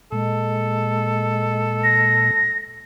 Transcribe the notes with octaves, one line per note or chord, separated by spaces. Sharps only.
A#2 G#3 A4
A#6